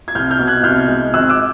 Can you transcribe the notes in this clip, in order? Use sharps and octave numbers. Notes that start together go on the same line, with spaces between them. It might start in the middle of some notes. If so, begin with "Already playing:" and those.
G#6
C2 F6 G6
F6 G6
B2
F#6 G#6
C2 F6 G6
G#3
G#1 E6 F#6
D6 E6